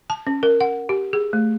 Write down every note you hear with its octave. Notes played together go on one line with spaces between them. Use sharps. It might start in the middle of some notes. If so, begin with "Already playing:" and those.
A5
C#4
A#4
F#5
G4
G#4
A3